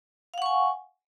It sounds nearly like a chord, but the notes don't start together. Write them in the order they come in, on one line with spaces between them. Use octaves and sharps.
F5 F#5 C#6 G#5